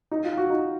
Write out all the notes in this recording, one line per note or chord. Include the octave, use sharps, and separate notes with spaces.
D#4
F4
F#4
D#4